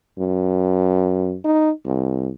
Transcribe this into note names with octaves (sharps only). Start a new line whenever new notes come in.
F#2
D#4
C2